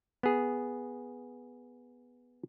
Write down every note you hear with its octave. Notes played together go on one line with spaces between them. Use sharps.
B3 G#4